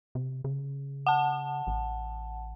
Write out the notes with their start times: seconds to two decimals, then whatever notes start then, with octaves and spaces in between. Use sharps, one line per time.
0.15 C3
0.44 C#3
1.06 F#5 A5
1.67 A1